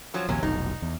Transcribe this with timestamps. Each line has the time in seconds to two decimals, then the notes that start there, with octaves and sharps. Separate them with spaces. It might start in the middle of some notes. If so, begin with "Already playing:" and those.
0.14 F3 F#3 C#4
0.29 A#1 D#2 C3 F#3 C#4
0.43 F1 B1 D#4
0.82 E2